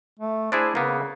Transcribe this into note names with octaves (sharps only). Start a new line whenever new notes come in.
A3
D4 E4 G#4 C5
C#3 A#3 B3